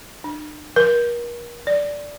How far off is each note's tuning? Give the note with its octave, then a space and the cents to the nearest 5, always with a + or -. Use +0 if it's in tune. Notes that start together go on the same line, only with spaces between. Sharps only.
D4 +45
A#4 +35
D5 -10